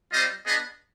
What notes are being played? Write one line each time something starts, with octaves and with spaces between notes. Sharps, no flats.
G3 C4 F4 C5 D#5
B3 D4 G#4 B4 D#5